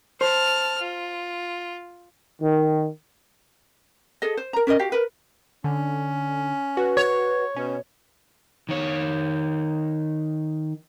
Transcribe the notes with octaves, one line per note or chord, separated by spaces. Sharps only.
C5 A5 F6
F4
D#3
G#4 A4 D#5
C5
A#4 A#5
C#4 A#4 C5 D#5
F#4 G4 F5
A#4 B4
D3 C#4
F#4 B4
C#5
B2 C#4
D#3 C#5